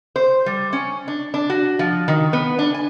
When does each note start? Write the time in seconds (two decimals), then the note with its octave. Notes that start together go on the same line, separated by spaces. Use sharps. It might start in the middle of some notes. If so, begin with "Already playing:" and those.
0.16 C5
0.46 G3
0.73 C#4
1.08 D4
1.34 D4
1.50 F#4
1.79 F3
2.08 D#3
2.33 B3
2.59 D4
2.74 G#5